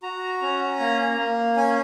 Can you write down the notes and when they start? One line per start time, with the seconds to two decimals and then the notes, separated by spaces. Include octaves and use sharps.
0.03 F#4 A#5
0.42 C#4
0.80 A#3
1.18 A#3
1.56 C#4 G#5